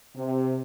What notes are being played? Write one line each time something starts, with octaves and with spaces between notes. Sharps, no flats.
C3